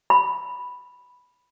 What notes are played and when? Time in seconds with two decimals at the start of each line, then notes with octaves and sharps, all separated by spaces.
0.10 B5